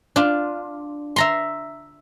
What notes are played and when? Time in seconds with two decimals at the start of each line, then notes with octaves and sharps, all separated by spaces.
0.16 D4 F4
1.16 E5 A#5 C6